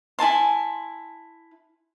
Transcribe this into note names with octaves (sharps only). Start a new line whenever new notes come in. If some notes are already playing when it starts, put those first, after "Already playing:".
E4 G#5 A5 C6